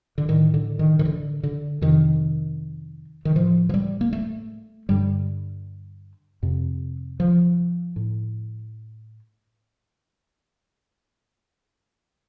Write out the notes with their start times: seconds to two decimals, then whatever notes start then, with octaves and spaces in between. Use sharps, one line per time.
0.18 D3
0.28 A2 D#3
0.54 D3
0.79 D#3
0.99 D#3
1.05 D3
1.43 D3
1.81 F2 C3 D#3
3.25 D#3
3.35 A2 F3
3.69 F3
3.74 G3
4.01 A#3
4.13 A3
4.89 G2 D3 G3
6.43 F2 C3
7.20 F3
7.96 A2